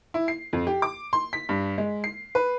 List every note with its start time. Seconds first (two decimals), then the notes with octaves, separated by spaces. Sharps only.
0.14 E4
0.28 C7
0.53 F2
0.67 G4
0.82 D6
1.13 C6
1.33 B6
1.49 G2
1.78 G#3
2.04 C7
2.35 B4